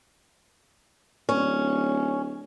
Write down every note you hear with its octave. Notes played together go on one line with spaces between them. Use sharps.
D1 C#4